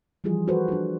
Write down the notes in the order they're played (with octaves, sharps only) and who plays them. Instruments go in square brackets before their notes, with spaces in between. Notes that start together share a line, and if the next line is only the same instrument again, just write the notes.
[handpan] E3 F3 G3 F4 G#4
F4 F#4 A4 B4 C5
D4 F4